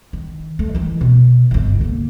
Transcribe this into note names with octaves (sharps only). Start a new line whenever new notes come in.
D#3
A3
D#3 E3
B2
G1 C#2
D3 A#3